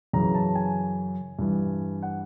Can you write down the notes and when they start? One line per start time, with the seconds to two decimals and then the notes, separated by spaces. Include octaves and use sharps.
0.13 F#2 C#3 E3 A#5
0.35 A5
0.55 G#5
1.39 G2 E3
2.03 F#5